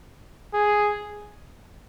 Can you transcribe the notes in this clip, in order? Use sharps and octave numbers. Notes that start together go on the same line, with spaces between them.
G#4